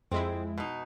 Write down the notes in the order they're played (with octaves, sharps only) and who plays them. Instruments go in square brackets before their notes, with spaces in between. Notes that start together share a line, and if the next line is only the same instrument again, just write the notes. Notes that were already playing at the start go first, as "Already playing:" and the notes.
[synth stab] F2 G#3 E4 [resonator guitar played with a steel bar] C4
[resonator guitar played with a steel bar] B2 D#4